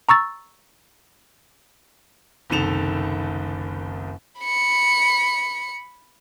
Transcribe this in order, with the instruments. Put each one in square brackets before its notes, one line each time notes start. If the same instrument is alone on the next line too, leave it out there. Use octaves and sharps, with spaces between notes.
[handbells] A#5 C#6 E6 A6
[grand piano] F#1 C2 D#3 A4 E7 F7
[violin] B5 C#7